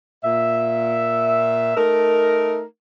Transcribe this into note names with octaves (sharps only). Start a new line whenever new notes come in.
A#2 E5
A3 D#4 A#4